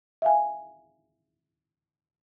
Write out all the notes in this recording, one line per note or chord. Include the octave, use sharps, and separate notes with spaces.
E5 F5 G#5